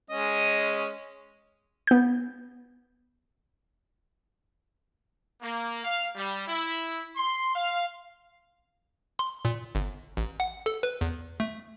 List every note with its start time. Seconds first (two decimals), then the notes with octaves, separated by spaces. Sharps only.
0.10 G#3 C#4 D#5
1.87 B3 G6
5.42 A#3
5.84 F5
6.17 G3
6.48 E4
7.17 C6
7.55 F5
9.19 C6
9.45 A#2
9.75 G1
10.17 A1
10.40 F#5
10.66 A4
10.83 B4
11.01 E2
11.40 A3